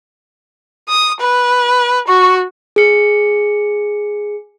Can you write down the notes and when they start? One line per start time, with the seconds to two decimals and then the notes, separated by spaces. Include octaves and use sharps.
0.89 D#6
1.20 B4
2.08 F#4 C#6
2.76 G#4 C#7